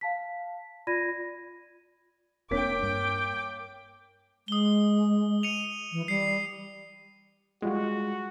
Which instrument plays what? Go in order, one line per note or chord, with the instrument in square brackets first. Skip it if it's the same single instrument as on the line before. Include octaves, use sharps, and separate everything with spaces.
[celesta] F5 A5 B6
F4 D5 B5 G#6 A#6 D#7
[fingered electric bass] E1 C4 D4 [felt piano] A#3 C#5 B6 [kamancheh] G5 D6
[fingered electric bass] G2
[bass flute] G#3 [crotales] D#6 G7
[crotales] C#7 D#7 F7
[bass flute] E3
[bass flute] G3 [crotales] C7 C#7
[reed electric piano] G3 G#3 [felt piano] F4 [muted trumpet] F#4